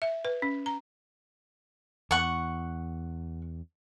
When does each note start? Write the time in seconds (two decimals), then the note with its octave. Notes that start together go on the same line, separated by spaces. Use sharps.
0.02 E5
0.25 B4
0.42 C#4
0.66 A#5
2.11 E2 F#5 C#6